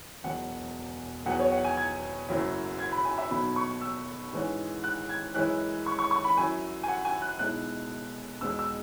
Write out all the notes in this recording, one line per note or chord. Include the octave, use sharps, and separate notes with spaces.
E1 E2 B2 F#3 F#5
E2 B2 F#3 B3 F#5
C#5
F#5
G#5
G#6
F#1 F#2 F#3 C#4 E4
G#6
B5
G#5
E5
B1 B2 F#3 B5
C#6
E6
G#2 E3 G#3 C#4
F#6
G#6
F#2 E3 G#3 C#4 E4 F#6
C#6
C#6
C#6
B5
F#2 F#3 E4 G#5
G#5
F#5
G#5
F#6
B1 B2 G#3 E4 F#6
E2 B2 G#3 E6
E6